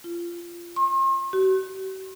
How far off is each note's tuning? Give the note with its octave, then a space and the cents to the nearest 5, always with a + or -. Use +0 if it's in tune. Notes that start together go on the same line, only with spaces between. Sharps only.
F4 -20
C6 +45
F#4 +45